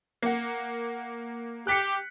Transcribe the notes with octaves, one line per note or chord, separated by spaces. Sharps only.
A#3 F#5
G4 F#6 B6 C#7